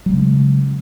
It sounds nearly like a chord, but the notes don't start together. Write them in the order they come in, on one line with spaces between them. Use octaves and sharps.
F#3 G#3 C#3 C#4